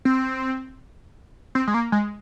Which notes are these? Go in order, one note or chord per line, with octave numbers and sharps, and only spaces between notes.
C4
C4
G#3
A#3
G#3